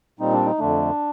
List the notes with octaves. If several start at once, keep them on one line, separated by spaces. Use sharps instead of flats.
A#2 G3 C4 D#4
D4
D#4
F2 D3 A3 D4